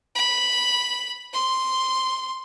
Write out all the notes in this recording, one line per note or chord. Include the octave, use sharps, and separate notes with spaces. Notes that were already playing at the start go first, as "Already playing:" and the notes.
B5
C6